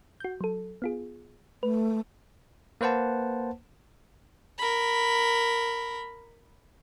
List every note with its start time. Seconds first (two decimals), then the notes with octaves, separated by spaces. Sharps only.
0.20 F#4 G6
0.41 F#3 A4
0.82 B3 F4 G#4
1.63 A3 B4
2.81 A#3 B4 C5 F#5 A5
4.58 A#4 B5